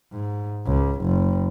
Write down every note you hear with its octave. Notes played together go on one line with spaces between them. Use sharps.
G#2
C#2
F#1